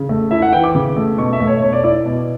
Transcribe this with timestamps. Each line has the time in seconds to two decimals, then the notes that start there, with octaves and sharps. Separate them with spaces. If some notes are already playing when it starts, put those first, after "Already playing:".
Already playing: C#3
0.09 A3
0.31 E4 E5
0.42 F#5
0.53 E3 G5
0.64 D6
0.75 C#3
0.97 A3
1.18 B2 C#6
1.33 E5
1.40 A3
1.47 C#5
1.62 B2 C#5
1.73 D5
1.84 E4 D5
2.05 B2